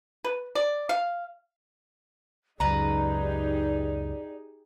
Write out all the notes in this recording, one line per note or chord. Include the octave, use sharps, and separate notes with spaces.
B4
D5
F5
C#2 F#2 D#4 G4 G#4 B4 D5 A#5